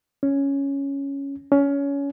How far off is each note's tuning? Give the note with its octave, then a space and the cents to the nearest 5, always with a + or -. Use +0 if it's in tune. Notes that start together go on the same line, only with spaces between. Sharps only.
C#4 +0
C#4 +20